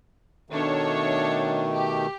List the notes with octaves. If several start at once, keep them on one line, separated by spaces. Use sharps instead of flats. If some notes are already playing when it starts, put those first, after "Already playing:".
B2 D#3 A3 D4 C#5
G4